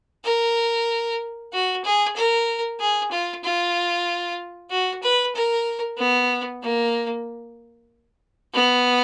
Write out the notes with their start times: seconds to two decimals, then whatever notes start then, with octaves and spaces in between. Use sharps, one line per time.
0.24 A#4
1.53 F#4
1.84 G#4
2.16 A#4
2.80 G#4
3.11 F4
3.44 F4
4.71 F#4
5.03 B4
5.35 A#4
5.98 B3
6.63 A#3
8.54 B3